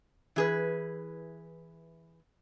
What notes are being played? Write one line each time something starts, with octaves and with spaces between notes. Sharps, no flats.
E3 G#4 B4